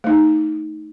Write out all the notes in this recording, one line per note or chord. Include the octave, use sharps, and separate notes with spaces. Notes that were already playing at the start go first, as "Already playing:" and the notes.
A3 D#4